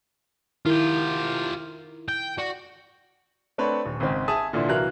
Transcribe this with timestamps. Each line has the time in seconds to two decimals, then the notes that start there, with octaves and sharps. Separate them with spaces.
0.66 D#3 E4 F4 G4 A#4
2.09 G5
2.38 F#4 D5
3.58 A3 C4 D4 B4 C#5
3.85 D#1
4.00 G#1 C#3 G#3 C4
4.28 G#4 E5 A5 D#6
4.53 A#2 D3 E3 D4 E4
4.68 C2 E3 F#3 A#4 F5 F#6